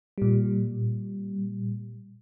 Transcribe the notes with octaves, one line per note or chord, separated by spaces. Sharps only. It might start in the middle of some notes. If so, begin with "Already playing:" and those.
A#2 G3